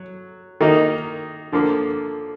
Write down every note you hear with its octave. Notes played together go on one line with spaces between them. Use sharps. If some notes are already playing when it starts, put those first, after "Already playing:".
Already playing: F#3
D#3 A#3 D#4
D3 F3 A#3